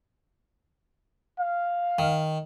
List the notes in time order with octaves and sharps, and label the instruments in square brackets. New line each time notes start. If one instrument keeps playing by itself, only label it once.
[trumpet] F5
[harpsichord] D#3